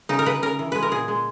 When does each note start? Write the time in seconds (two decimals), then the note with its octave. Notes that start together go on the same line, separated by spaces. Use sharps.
0.09 C#3 D#4
0.19 A#4
0.25 C#3 B4
0.42 C#3 A#4
0.59 E3
0.72 G#3 B4
0.82 A#4
0.91 A#2 G#4
1.08 G#3